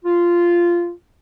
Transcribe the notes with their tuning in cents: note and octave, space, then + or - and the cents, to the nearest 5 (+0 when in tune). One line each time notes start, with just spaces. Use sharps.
F4 -10